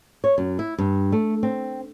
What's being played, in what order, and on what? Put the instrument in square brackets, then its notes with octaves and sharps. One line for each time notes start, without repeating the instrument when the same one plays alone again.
[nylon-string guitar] C#5
F#2
E4
G2
A3
C4